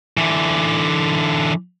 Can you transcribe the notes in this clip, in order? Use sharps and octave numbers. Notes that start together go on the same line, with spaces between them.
D3 E3